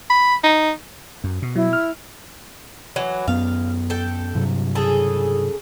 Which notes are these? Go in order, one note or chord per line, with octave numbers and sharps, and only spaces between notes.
B5
D#4
F#2
B2
F#3 E4
F6
E3 F#3
F#2 B3 F5
A4 G5
G2 C3 F#3
C#3 G#4 A4